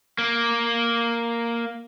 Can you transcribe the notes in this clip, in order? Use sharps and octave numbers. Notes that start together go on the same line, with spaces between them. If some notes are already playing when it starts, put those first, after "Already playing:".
A#3